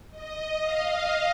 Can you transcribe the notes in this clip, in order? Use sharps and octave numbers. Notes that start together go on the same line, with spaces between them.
D#5
F5